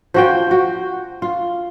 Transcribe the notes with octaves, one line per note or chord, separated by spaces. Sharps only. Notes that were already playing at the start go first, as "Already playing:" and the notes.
F3 F#4 G5
F#4
F4